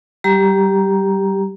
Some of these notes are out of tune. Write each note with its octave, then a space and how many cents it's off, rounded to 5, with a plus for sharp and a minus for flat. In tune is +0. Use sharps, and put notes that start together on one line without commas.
G3 -25 G4 +0 A#5 +10